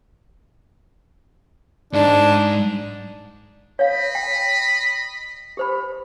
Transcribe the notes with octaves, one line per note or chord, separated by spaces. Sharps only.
G#2 D4 D#4
C#5 D#5 F5 B5
G5
G4 C5 B5